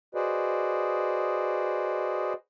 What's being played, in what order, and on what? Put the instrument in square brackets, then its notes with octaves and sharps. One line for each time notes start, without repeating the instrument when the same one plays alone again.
[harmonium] F#4 G#4 B4 C5 D5 D#5